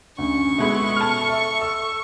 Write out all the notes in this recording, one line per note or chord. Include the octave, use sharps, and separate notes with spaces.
D2 C#4 C#6
B2 G#3 A4 E5 B5
A5 F6
E5
E6